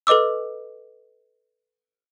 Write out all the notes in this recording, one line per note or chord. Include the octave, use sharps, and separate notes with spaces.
A4 B4 D#5 D6 E6